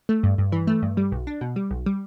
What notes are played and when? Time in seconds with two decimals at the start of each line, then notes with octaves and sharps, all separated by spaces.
0.09 A3
0.23 G2
0.38 G2
0.52 E3
0.67 A3
0.82 G2
0.97 G3
1.12 B1
1.27 D4
1.41 B2
1.56 G3
1.71 B1
1.86 G3